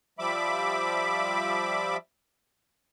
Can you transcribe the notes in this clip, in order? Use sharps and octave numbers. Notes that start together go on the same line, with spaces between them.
F3 G3 E5 B5 D6